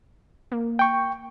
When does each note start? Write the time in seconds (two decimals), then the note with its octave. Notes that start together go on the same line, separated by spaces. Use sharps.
0.52 A#3
0.79 G5 C#6